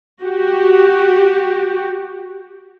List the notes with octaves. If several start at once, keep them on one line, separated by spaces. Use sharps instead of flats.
F#4 G4